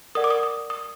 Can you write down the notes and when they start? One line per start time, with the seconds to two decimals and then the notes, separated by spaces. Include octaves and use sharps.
0.15 A#4 D5 F#5 D#6
0.24 D6
0.31 D#6
0.43 D#6
0.70 D#6